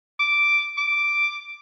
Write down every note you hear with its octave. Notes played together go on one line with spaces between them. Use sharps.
D6
D6